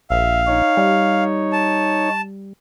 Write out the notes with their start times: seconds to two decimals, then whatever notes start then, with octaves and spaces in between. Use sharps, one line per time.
0.10 A#1 E5 F5
0.47 D#4 C#5
0.77 G3
1.52 A5